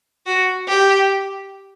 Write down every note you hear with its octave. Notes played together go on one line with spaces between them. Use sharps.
F#4
G4